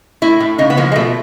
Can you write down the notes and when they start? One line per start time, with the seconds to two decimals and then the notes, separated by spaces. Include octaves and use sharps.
0.22 A2 E4
0.40 A2
0.58 C#3 D#4
0.70 B3
0.77 F3 A#3
0.92 G#3
0.96 B2 A3